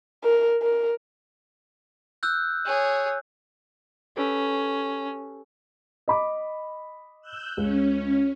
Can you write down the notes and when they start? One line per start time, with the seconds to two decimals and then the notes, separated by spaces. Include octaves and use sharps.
0.24 A#4
0.62 A#4
2.23 E6 F#6 G6
2.65 G#4 C#5
4.17 C#4 G4 A4 B4
6.08 D#5 B5 D6
7.21 E6 F#6 G6
7.57 C#2 C#4